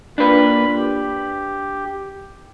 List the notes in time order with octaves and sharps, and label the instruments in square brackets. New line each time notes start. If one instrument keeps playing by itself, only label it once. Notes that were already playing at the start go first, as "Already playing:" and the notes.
[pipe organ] A#3 F4 B5 [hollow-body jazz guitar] D4 B4
[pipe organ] G4